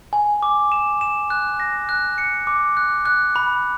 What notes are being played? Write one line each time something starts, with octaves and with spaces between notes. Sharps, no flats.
G#5
D6
E7
E7
F#6
A#6
F#6
C#7
D6
F#6
F#6
B5